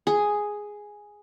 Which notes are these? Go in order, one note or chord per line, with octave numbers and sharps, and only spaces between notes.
G#4